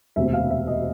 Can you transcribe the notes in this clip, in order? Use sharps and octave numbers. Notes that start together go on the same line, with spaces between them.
E1 D2 C3 E5
F5
E5
D#5